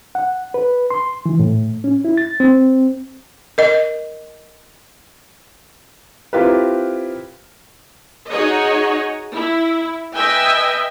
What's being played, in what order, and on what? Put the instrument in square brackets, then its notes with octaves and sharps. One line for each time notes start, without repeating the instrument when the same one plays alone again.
[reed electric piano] F#5
B4
C6
E3
A2
C#4
E4
A6
C4
[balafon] A#4 D#5
[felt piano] C4 E4 F4 G4 A#4 B4
[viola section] D#4 F#4 G#4 C#5 D#5
E4
B4 D#5 E5 G5 G#5